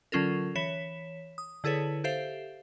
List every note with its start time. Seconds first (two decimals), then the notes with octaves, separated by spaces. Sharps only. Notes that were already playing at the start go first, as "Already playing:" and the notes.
0.12 D3 F#3 C#4 F4 A4 A#4
0.55 E3 C#5 B6 E7
1.38 D#6
1.64 D3 E4 G#4 A4 B4 C#5
2.04 G4 A4 C5 E5 F5